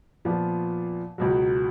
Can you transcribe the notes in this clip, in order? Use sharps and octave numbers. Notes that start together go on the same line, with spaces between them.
A#2 F3 B3
C#2 B2 F#3